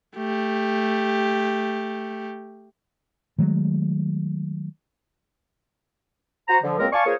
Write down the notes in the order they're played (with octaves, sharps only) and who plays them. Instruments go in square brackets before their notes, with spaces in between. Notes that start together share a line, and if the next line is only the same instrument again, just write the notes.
[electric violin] A3 G4
[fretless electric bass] D#3 F#3 G#3 A3
[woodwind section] F#4 C5 A#5
D3 F3
C#2 F#2 G#3 A#3 C4 A#4
D5 F5 G#5 A5 C#6
A#3 F4 G#4 A#4 C5 C#5